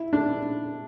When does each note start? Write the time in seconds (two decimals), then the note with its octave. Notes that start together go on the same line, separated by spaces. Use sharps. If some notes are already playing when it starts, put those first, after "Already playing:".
Already playing: E4
0.13 D4